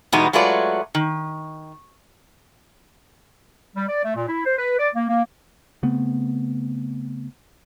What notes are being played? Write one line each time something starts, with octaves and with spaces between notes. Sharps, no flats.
E2 B2 G3 G#3 B3 D#4
F#3 G#3 A3 F4 B4 D5
D#3
G3
D5
A3
A#2
E4
C5
B4
D5
A#3
A#3
C#3 A3 B3 C4